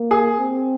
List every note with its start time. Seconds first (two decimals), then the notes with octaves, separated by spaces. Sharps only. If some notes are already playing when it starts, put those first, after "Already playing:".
Already playing: A#3
0.11 G#4
0.39 C4